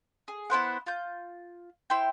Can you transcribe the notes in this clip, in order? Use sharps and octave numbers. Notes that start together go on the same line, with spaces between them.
G#4
B3 E4 C5 F#5
F4 G6
E4 C5 G5